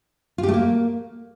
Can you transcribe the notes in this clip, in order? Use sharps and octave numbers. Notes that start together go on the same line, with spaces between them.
F4
G4
A3
A#3